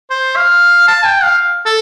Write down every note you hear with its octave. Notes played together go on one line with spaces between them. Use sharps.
C5
F5
A5
G5
F5
A4